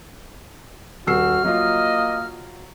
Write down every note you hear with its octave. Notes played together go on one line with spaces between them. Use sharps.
D#1 F#4 E6 F6 C7
F#3 A#3 F4 D#5